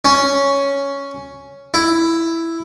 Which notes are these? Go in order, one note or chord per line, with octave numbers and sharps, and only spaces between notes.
C#4
E4